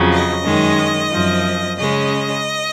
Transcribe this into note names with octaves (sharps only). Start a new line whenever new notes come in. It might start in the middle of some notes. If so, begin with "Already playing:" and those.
Already playing: F2 C#3 F#3
D#5
F#2 D#3 G#3 C#4
F#2 F3 C4
C#3 G#3 C#4 D#5